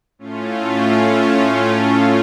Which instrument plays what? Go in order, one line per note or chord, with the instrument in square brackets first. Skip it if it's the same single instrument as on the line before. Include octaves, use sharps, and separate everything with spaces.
[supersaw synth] A2 A3 C#4 F4